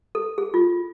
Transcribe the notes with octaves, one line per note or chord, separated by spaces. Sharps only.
A4
G#4
F4